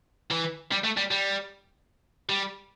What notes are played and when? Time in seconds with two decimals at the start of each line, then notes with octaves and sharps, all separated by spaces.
0.31 E3
0.72 G3
0.84 A3
0.97 G3
1.11 G3
2.30 G3